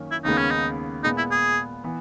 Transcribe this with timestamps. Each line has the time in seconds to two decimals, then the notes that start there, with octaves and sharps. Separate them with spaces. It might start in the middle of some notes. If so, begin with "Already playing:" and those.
Already playing: F#2 D#3 A#3 C#4
0.11 E4
0.24 D#2 C#3 G#3 B3 D#4
0.38 C#4
0.51 D#4
1.04 A#2 G#3 B3 D#4
1.17 E4
1.31 G#4
1.84 E3 B3